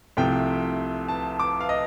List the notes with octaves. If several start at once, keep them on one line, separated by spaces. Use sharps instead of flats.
C2 C3 F3 A3 G5
A5
D6
F5
D#5